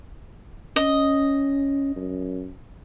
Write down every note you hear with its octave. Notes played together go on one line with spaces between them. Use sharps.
C#4 D#5
F#2